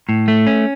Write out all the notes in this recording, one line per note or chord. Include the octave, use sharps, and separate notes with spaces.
A2
A3
C#4